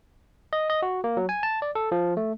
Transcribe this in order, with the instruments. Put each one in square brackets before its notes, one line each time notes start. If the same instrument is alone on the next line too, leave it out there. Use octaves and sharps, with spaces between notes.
[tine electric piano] D#5
D#5
F#4
A#3
F#3
G#5
A5
D5
A4
F3
A3